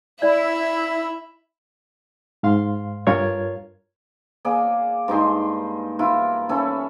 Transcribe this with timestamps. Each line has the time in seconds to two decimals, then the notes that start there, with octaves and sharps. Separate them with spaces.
0.22 E4 D5 E5 B5
2.43 G#2 F5 C6
3.07 G2 F4 A#4 C#5 G#6
4.45 A#3 G#4 D5
5.08 G2 G#3 D#4 C6
5.99 E4 F4 A#4
6.49 C#4 E4 A4